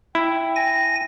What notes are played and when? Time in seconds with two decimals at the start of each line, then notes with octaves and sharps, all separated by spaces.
0.15 E4 G5
0.56 G#5 A#6